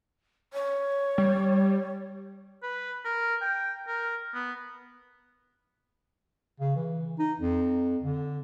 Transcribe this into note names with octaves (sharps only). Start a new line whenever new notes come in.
C#5
G3
B4
A#4
G5
A#4
B3
C#3
E3
D#4
F2
D3